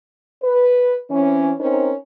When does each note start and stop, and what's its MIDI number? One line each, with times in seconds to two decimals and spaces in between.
0.43 0.98 71
1.10 1.52 52
1.10 1.52 60
1.10 1.52 61
1.60 1.93 60
1.60 1.93 61
1.60 1.93 63
1.60 1.93 70
1.60 1.93 72